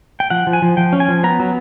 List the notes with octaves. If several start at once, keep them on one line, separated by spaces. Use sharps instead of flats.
G5
F3 F#5
F3
G#5
F3
F3 G5
C#4
G#5
F3
B3 A#5
F#3